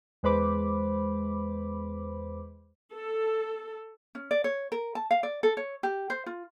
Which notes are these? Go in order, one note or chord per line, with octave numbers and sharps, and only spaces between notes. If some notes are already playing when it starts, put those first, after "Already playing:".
E2 G#3 B4 C5 B5 D6
A4
C#4
D5
C#5
A#4
A5
F5
D5
A4
C#5
G4
C5
F4